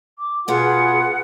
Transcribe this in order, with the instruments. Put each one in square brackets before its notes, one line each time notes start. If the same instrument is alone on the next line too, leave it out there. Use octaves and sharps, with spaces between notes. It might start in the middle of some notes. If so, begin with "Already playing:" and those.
[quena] D6
[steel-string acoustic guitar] B2 B3 [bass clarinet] F4 [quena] G#4 [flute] F#5